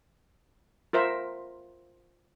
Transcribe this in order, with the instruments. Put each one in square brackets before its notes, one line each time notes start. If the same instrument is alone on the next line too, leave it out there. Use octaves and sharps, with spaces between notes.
[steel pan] F4 A#4 C5 E5 A#5